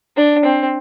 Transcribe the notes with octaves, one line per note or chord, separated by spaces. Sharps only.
D4
C4